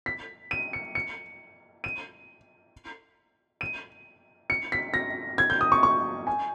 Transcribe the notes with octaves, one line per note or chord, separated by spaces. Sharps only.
B6
D#7
C#7
C#7
D#7
D#7
C#7
B6
A#6
G#6
G6
D#6
C#6
C#6
G#5